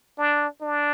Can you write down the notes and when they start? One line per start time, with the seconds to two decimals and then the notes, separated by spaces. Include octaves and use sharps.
0.18 D4
0.61 D4